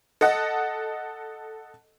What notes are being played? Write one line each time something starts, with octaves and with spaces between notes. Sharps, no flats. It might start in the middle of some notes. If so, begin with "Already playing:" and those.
A4 D#5 F#5